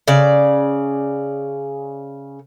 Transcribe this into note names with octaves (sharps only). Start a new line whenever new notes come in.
C#3 D5